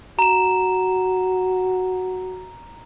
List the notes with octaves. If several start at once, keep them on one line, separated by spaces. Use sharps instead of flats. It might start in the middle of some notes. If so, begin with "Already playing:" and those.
F#4 A#5 E7